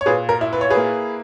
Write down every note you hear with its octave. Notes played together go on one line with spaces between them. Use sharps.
C#5
A#2 G#4 B4
A#4
E4
B4
C#5
G#4 B4
A#3